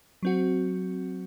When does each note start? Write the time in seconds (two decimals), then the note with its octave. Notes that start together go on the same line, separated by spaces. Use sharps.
0.23 F#3 C4 F#4